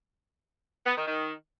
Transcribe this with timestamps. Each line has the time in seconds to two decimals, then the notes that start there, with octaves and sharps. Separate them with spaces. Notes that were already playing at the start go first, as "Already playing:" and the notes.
0.86 B3
0.96 D#3
1.06 D#3